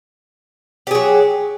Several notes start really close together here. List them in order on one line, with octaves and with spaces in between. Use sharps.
G4 G#4 F#3